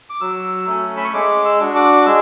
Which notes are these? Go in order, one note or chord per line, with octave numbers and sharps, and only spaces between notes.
D6
F#3 E6
A3 C#4
B5
C#6
G#3 D6
E6
D4 F#4
D6
G#3 E6